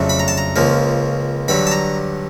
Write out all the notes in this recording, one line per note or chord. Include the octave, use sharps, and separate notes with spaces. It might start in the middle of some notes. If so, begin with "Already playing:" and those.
Already playing: F2 C#3 F#3 A3 D4
B5
A#5
A5
A#5
C#2 C#3 F3 A#3
G2 D3 F#3 B5
A5
A#5